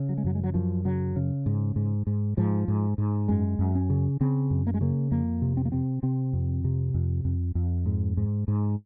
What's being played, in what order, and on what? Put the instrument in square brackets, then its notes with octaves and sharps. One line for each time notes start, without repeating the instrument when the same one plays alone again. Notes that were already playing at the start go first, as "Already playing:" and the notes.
Already playing: [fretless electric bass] C#3
F#3
G#3
F#2 F#3
G#3
F#3
F#2 F3
C#3 F#3
C#3
G#2
G#2
G#2
G#2 F3
G#2
G#2
F#2 G#3
F#2
C#4
C#3
C#3 C4
F#2
A#3
G#3
C#3 A#3
F2 A#3
C3
C4
A#3
C3 C4
C3 C4
F2
C3
F2
F2
F2
G#2
G#2
G#2